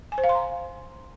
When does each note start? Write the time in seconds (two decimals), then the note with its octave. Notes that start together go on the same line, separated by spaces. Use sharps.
0.12 G#5
0.18 C5
0.24 F5
0.29 C6
0.35 A#5